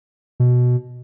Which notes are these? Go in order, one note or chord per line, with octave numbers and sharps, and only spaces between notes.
B2